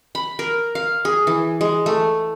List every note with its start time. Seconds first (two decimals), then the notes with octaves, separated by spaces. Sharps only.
0.15 B5
0.39 A#4
0.75 F5
1.05 G#4
1.27 E3
1.61 G#3
1.86 A3